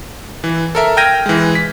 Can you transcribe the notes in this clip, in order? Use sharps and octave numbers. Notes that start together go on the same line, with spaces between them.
E3
A4 A#4 E5
G5 F6 G6 G#6 A#6 D#7
E3 G#3
B6